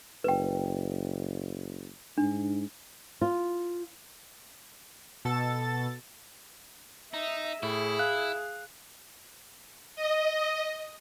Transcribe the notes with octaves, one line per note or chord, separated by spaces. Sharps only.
F#1 B4 G5
G#2 D4
F4
B2 A4 A6
D#4 E5
A2 E4 G#4
F5 F#6
D#5